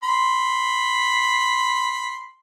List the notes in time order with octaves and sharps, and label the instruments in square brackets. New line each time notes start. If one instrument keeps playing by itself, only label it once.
[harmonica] B5 C6